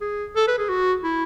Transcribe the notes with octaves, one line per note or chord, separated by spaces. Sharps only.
G#4
A4
B4
G#4
F#4
E4